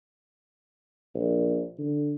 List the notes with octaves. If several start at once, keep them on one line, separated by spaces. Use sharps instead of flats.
A#1
D3